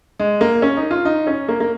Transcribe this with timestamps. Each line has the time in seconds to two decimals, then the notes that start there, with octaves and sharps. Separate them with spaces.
0.19 G#3
0.41 A#3
0.62 C#4
0.77 D#4
0.91 F4
1.05 D#4
1.27 C#4
1.48 A#3
1.60 A#3